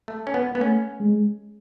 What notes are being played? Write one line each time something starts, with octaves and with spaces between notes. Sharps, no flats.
A3
C#4
B3
B3
A3 C#4
G#3